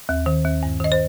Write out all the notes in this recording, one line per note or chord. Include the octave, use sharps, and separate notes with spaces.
D#2
D#3
D#2
G2
D#3 D#5
C5